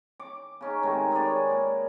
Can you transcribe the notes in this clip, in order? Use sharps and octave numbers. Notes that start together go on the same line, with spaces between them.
D6
C#3 C#4 D#4
C3 D#3 G#3 A3
G#4 B4 C#5 D5
A#2